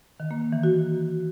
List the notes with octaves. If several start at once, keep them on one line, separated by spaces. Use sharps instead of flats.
D#3
A#3
D#3
E3
F#4